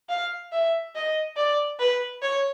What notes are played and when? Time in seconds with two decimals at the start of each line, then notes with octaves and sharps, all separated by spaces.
0.09 F5
0.52 E5
0.95 D#5
1.37 D5
1.79 B4
2.22 C#5